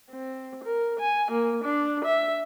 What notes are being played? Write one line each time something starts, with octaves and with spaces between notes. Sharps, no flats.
C4
A#4
G#5
A#3
D4
E5